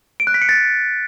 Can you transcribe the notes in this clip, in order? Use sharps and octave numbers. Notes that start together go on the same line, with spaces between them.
D7
F#6
B6
C#7
A6